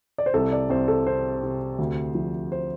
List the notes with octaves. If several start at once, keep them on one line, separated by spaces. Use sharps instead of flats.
D5
C5
C2 A4
D5
C2 C5
A4
C3 C5
C3
D2
F3
C5